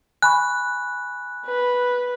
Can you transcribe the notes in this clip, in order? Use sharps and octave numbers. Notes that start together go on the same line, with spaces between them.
G#5 B5 C#6 F#6
B4